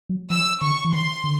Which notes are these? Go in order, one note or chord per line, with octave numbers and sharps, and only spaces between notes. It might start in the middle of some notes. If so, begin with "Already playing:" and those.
F#3
F3 E6
D3 C#6
E3
D#3 C6
D3